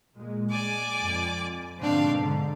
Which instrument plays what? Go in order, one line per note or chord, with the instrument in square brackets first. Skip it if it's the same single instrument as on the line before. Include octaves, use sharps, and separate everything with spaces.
[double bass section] A#2 G#3
[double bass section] G#3 [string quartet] D5 G#5 D6
[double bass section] F2
[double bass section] G#2 B2 D3 [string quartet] C4 D4 F5
[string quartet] G#2 [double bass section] D3